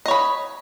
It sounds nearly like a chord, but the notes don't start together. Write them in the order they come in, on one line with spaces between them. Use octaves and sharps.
D#5 C#5 B5